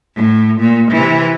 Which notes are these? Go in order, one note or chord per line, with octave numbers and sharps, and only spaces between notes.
A2
A#2
C3 E3